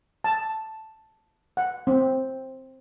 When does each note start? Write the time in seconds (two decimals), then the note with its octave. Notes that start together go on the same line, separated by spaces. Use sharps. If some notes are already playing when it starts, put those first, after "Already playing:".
0.24 A5
1.57 F#5
1.87 C4